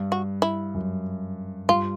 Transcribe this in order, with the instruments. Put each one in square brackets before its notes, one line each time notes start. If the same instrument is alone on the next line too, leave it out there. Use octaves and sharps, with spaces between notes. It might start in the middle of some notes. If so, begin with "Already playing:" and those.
Already playing: [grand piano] G2
[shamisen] F#4
E4
[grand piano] F#2
[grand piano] G2 [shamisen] F4